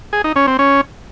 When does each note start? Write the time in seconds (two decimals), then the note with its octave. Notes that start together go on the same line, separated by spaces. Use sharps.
0.13 G#4
0.24 D#4
0.36 C#4
0.47 C4
0.59 C#4